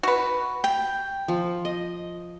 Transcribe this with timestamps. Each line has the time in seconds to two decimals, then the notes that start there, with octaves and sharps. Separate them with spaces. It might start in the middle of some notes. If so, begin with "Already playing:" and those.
0.03 F#4 B4
0.64 G5
1.28 F3
1.65 D#5